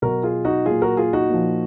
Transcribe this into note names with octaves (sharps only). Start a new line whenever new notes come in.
B2 F#3 F#4 A#4
F4 G#4
D#4 F#4
A#2 F#3 F4 G#4
F#4 A#4
F4 G#4
D#4 F#4
A#2 F3